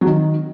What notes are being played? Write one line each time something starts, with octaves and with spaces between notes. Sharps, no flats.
F#3
D#3